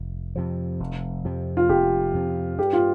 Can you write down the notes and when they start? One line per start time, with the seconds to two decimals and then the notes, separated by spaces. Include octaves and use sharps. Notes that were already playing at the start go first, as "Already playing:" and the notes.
Already playing: F1
0.36 F2 C3 F3
0.80 F1
1.25 F2 C3 F3
1.57 F4
1.69 F1 G4
2.14 F2 C3 F3
2.59 G2 G4
2.73 F4